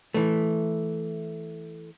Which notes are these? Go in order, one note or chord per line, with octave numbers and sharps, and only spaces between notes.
E3 A3